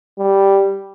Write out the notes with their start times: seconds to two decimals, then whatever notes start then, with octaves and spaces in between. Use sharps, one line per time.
0.19 G3